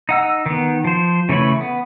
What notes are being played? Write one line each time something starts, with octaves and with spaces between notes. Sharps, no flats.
D#4 F#5 E6
D#3 B3
F3 C5
C#3 E3 A3 C#5 B5
B3